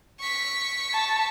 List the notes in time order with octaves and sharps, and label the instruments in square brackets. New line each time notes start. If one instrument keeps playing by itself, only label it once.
[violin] C#6 B6
[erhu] A5